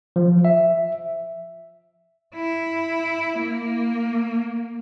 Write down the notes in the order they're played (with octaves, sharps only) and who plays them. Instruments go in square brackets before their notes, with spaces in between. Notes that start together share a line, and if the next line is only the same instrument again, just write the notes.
[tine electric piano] F3
E5
[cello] E4
A#3